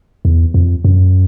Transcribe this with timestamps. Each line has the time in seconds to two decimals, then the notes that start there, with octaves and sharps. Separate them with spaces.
0.25 E2
0.54 F2
0.84 F#2